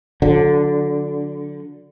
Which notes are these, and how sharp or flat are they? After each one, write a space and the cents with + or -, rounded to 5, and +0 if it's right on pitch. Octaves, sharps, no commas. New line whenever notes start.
D3 -10 F#3 -40